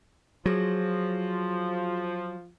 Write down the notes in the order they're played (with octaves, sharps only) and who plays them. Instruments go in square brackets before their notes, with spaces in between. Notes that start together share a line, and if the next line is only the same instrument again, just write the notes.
[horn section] F3 [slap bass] F#3 [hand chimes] F#4 G#4 A#6